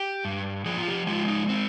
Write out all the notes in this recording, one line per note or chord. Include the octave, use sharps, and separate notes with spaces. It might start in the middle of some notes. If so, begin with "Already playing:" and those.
Already playing: G4
G2
F3 G#4
F4
G4
G#3 F4
D#4
C4